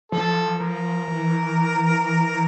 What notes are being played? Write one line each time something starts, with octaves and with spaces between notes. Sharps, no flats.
F3 A4
F3 A#4
E3